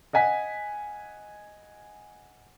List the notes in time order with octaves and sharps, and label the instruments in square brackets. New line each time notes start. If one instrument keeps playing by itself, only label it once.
[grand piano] D#5 F#5 G#5 B6